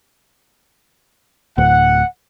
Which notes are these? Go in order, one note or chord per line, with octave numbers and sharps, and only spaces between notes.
D1 D2 A2 F#5